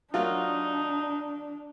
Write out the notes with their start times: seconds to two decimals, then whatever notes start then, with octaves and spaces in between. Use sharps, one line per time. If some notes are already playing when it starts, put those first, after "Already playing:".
0.14 F#3 A#3 D4 D#4 F4